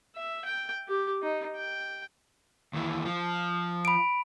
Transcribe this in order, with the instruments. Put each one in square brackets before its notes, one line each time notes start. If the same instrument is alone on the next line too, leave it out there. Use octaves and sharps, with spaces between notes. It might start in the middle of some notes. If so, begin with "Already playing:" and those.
[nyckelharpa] E5
G5
G4
D#4
G5
[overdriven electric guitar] D#2 E3
F3
[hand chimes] B5 D7